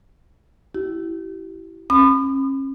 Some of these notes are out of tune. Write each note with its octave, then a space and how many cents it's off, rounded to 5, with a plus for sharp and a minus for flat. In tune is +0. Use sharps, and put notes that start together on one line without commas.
E4 +0 G4 -35
C#4 -40 B5 +25 D#6 -40